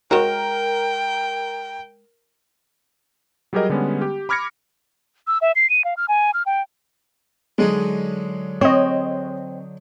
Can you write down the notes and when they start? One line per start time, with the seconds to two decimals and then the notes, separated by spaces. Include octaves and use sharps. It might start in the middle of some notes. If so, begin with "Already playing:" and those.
0.11 G#3 F#4 A#4 C#5 G5
3.53 F#3 G3 G4 G#4 A#4 D#5
3.69 D3 G3 G#3 B3 C#4
4.02 G4
4.29 B5 D6 F6 G#6 A#6 C#7
5.27 E6
5.41 E5
5.56 C7
5.70 D#7
5.84 F5
5.97 F6
6.08 G#5
6.34 F6
6.46 G5
7.58 D3 F#3 G#3 D#4
8.61 C4 C#5 D#5